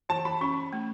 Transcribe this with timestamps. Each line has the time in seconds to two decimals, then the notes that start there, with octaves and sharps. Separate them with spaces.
0.09 E3 A5
0.25 B5
0.41 C#4 C#6
0.73 A3